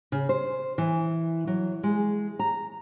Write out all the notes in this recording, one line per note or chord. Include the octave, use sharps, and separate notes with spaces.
C#3
C5
E3
F#3
G#3
A#5